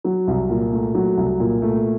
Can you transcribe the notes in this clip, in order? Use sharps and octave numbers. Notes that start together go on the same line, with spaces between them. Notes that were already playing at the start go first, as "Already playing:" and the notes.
F#3
C2
A#2
A3
F#3
C2
A#2
A3